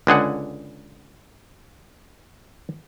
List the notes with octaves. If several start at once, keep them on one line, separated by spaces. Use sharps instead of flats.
C#2 D3 G#4 F#5